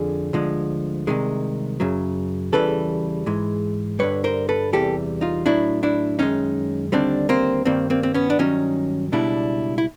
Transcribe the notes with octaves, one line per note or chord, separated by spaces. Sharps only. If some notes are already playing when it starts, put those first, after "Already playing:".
Already playing: F2 D3 F3 G#4
D2 D3 F3 G#3
C2 C3 D#3 G#3
F#2 C#3 F#3
E2 C#3 E3 G3 A4 B4
G#2 E3 G#3
G2 D3 G3 B4 C#5
A#4 C5
A4 B4
E2 C3 E3 G3 G4 A4
D#4 F4
A2 F#3 D4 E4
D4 E4
F#2 D#3 G#3 C#4 D#4
D#2 D3 G3 C4 D4
A#3 C4
G2 D#3 G3 A#3 C4
A#3 C4
C4
B3 C#4
D4
G2 D#3 F#3 C#4 D#4
C#2 B2 G3 D4 E4
E4